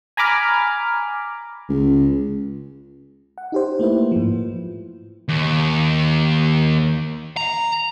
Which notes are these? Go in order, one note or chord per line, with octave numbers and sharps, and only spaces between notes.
G#5 A#5 B5 D6 F6
C#2
F#5
D#4 G4 C5
A3 A#3 E4 B4
G#2 F3
D#2
A#5